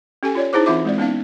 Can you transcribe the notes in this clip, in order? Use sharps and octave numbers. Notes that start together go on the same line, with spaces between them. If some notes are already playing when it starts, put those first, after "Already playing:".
C#4 G4 A4 G#5
F4 C#5 D5
D#4 E4 G#4 C5 D6
E3 C4 F4 E5 D6
G#3 C4 D5
B3 C#4 D#4 F5